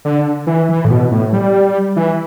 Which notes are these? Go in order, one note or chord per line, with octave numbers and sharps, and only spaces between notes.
D3
E3
E3
A2
B2
A2
G3
E3